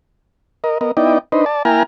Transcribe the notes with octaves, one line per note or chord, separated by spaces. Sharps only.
A#4 D#5
B3 A#4 D#5
B3 D#4 E4 D5 D#5 G5
D4 D#4 B4 C5 D#5
D5 A5
A#3 E4 G5 G#5 A#5 F6